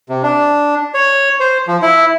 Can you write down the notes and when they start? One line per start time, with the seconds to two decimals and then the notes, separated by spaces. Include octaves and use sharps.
0.09 C3
0.23 D4
0.94 C#5
1.40 C5
1.67 F3
1.82 E4